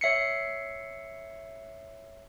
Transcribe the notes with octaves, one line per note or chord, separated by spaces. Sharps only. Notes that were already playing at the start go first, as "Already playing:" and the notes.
C#5 E5 C7 C#7